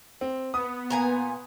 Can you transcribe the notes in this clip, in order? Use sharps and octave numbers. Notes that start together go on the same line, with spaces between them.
C4
B3 D#6
A#2 G#5 A#5